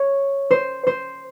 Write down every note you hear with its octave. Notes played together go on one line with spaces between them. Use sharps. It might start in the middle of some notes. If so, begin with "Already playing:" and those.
Already playing: C#5
C5
C5